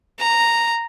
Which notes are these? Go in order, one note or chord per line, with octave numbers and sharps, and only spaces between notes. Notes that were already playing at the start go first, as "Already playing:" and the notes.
A#5